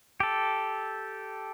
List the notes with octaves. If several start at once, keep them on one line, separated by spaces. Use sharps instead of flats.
G4 A4